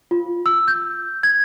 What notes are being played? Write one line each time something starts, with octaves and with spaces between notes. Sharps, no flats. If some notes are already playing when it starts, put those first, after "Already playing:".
F4
E6
G6
G#6